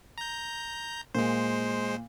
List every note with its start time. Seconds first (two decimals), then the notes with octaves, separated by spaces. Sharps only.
0.18 A#5 G6
1.15 A#2 G#3 C5